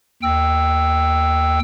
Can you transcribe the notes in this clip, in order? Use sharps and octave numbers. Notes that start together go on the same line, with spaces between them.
D#2 G5 E6